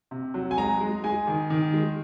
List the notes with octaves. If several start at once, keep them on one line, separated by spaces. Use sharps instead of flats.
C3
F#3
G#5
G#3 A#5
G#3
G#3 G#5
D#3
D#3
G#3